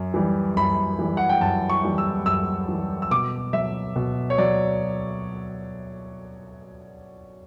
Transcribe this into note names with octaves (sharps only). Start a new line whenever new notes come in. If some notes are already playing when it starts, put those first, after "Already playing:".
Already playing: F#2
E3 G3
F#2 B5
E3 G3
F#5
G5
F#2 A5
C#6
E3 G3
E6
F#2 E6
E3 G3
E6
B2 D6
F#3 E5
B2
C#5
F#3 D5